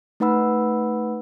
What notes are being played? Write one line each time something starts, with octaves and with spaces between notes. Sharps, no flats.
A3 D#4 B4 F#5 B5 E6